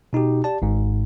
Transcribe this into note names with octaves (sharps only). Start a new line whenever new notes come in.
B2 D#4 F#4 G4
G4 D5 A5
G#1 G#2